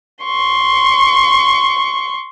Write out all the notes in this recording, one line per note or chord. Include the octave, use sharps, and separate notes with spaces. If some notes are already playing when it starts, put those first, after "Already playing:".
C6 C#6